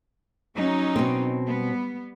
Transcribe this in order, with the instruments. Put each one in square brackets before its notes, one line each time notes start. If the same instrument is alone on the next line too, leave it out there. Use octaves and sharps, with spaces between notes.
[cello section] F#3 C#4 D#4
[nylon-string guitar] B2 C4
[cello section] G3 B3